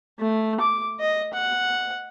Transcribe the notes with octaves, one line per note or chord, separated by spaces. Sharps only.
A3
D6
D#5
F#5